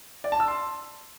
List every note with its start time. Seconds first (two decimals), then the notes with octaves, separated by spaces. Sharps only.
0.24 D5
0.32 A5
0.40 E6
0.48 C6